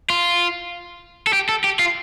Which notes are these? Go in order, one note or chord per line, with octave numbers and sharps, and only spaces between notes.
F4
A4
G4
A4
G4
F4